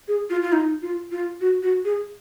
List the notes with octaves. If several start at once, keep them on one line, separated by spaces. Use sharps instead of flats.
G#4
F4
F4
D#4
F4
F4
F#4
F#4
G#4